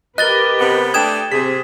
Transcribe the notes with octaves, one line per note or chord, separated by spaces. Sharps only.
G4 A#4 B4 D#5 F#6 A6 G7
C3 B3
A3 D4 G5 D#6 G#6 E7
C3 C4 G#4 B6